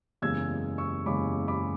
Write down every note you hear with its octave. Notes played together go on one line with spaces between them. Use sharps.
F#1 E2 C#3 G#3 E6 G#6
C#6 E6
F#1 E2 C#3 G#3 B5 D6
B5 D6